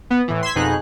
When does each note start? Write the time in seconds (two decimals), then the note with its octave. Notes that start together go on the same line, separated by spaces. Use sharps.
0.10 B3
0.28 A2 E3
0.43 C6 E6 G#6 B6
0.55 F2 B2 D#4 G#4 F#6